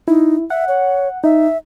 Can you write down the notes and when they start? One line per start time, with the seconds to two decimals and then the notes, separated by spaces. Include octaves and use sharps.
0.08 D#4 E4
0.50 E5 F#5
0.68 C#5
1.24 D#4 E5